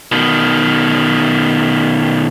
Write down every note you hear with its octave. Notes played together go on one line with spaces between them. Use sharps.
B2 D#3